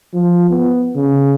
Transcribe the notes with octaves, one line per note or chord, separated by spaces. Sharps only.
F3
B3
C#3